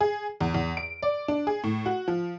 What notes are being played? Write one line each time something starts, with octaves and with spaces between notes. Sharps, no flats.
G#4
E2
E2
D7
D5
D4
G#4
A2
F#4
F3